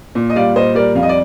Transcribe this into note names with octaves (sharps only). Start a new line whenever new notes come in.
A#2
D#5
G3 D5 F5
A#2 C5 D#5
G3 A#4 D5
F2 F5
D#5
D5